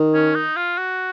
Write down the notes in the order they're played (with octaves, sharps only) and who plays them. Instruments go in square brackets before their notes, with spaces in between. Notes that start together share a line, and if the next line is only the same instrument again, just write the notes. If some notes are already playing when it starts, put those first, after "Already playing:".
Already playing: [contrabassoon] D#3
[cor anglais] C#4
D#4
F4
F#4